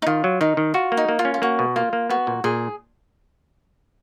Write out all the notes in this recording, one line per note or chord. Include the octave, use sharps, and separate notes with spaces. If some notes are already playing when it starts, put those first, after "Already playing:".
D#4
D#3 F4
F#3
D#3 D#4
D#3
F4 F#4
A#3
D#4
A#3
F4
C#4
F4
A#3 F#4
B2
A#3 F4
A#3
B3 F#4
A#2
A#2 G#4